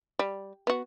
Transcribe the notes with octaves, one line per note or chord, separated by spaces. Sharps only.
G3
B3 F#4